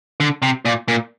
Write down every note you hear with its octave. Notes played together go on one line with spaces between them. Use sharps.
D3
C3
A#2
A#2